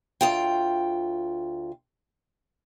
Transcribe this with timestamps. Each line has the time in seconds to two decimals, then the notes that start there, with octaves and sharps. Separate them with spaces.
0.21 D2 F4 G5